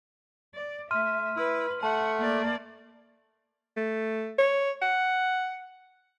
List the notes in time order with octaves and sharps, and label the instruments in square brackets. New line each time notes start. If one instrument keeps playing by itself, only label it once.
[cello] D5
[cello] A3 E5 [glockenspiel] C6 F6 D#7
[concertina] E4 [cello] B4
[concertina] A3 [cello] F#5 [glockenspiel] A5
[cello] A#3 D5
[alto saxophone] A3
C#5
F#5